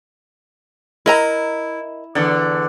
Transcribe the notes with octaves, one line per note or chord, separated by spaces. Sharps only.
E4 A#4 D#5 A#5
E2 D3